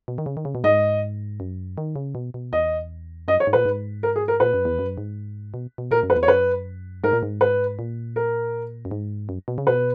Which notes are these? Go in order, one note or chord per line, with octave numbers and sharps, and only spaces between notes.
B2
D#3
C#3
D#3
C#3
B2
G#2 D#5
F#2
D#3
C#3
B2
B2
E2 D#5
F#2 D#5
C#5
G#2
A#2 B4
G#2
A#4
G#4
A#4
A#2 B4
F#2
E2
F#2
G#2
B2
B2
A#2 A#4
F#2
B4
E2
C#5
F#2 B4
G#2 A#4
A#2
G#2
B4
A#2
A#4
F#2
G#2
F#2
B2
C#3
B2 B4